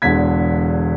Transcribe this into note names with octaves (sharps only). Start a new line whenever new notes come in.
E1 E2 D3 G#6 B6